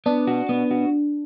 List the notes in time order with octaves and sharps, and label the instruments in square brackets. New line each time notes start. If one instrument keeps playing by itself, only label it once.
[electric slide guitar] B3 [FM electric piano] D4
[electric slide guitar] F#4
B3
F#4